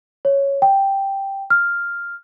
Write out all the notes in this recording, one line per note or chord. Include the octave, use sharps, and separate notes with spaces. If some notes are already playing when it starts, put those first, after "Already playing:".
C#5
G5
F6